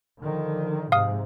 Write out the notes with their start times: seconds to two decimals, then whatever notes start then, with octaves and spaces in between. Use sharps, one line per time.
0.20 D3 D#3 F3
0.92 G#2 C3 F5 D#6